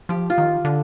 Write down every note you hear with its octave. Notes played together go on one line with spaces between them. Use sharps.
F3 G4
F4
D#3
D3